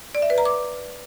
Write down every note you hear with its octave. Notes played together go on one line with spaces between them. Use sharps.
D5
E5
B4
A#5
D6